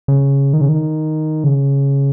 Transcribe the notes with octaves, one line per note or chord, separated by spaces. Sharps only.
C#3
D#3
C#3
D#3
C#3